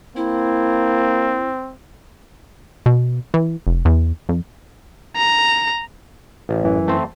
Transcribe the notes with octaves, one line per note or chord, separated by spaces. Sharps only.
A#3 C4 E4
B2
E3
F1
E2
F2
A#5
A1
F#2 E3
A3 C4 C5